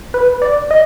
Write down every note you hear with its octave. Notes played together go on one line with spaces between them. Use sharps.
B4
D5
D#5